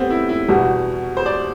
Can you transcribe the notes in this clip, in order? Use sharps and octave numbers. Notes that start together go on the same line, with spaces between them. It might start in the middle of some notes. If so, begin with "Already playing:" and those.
Already playing: G3 A3 B3 C4
E4
E4
E2 B2 G3 F#4
C5
D5